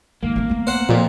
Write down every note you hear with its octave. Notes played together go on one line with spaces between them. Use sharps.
D#3 G#3 A#3
A3 C4
A3 B3
C5 F#5
F2 A#2